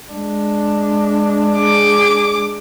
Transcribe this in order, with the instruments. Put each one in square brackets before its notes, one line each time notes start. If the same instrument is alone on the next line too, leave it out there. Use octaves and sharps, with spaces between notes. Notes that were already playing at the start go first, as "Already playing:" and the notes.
[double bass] G#3 D4
[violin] G#4 D6